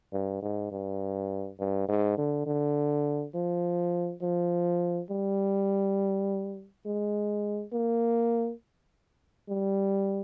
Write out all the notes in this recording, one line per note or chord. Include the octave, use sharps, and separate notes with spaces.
G2
G#2
G2
G2
G#2
D3
D3
F3
F3
G3
G#3
A#3
G3